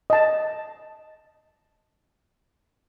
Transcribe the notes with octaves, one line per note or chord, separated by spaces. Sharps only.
D#5 A5